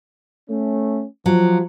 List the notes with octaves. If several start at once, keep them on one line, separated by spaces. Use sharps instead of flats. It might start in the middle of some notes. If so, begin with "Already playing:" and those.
A3 C#4
F3 F#3